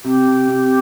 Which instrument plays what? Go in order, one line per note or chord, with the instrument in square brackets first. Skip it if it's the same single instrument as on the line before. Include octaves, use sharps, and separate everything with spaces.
[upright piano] C3 [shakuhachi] G4
[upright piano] C3
C3